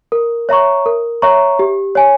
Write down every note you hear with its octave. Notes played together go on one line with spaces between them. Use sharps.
A#4
C#5 E5 A#5 C#6
A#4
C#5 E5 A#5 C#6
G4
C#5 G#5